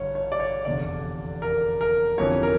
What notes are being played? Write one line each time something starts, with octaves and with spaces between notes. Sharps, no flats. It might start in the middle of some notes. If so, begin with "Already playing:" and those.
Already playing: A1 G2 D3 C#5
C#5
D5
C#5
F1 E2 D3 D5
A#4
A#4
G1 F2 E3 C#5
A#4